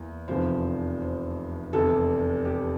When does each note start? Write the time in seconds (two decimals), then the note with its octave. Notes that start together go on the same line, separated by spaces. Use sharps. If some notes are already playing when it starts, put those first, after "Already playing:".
Already playing: E2 E3 A#3
0.28 F1 E2 C3 F3 C5
1.01 C5
1.73 F1 E2 C3 A4
2.45 G4